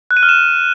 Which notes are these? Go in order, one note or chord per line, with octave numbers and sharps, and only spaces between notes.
F#6
D#7
F6
E7